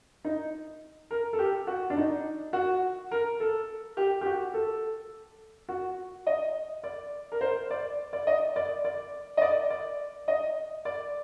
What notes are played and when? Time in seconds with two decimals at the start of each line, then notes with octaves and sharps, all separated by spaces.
0.24 D#4
1.11 A#4
1.33 A4
1.39 G4
1.67 F#4
1.90 D4
1.97 D#4
2.53 F#4
3.11 A#4
3.40 A4
3.97 G4
4.21 G4
4.26 F#4
4.54 A4
5.69 F#4
6.27 D#5
6.84 D5
7.32 A#4
7.41 C5
7.71 D5
8.13 D5
8.27 D#5
8.56 D5
8.85 D5
9.37 D#5
9.42 D5
9.70 D5
10.28 D#5
10.85 D5